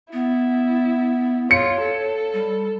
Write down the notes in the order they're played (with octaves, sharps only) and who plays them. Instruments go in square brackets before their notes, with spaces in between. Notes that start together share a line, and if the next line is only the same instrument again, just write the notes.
[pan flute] B3 [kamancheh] E4
[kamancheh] F4 [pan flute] C#5 [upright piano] C#7
[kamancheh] A4
[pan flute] G3